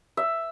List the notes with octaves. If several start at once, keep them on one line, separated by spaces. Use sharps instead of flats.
E5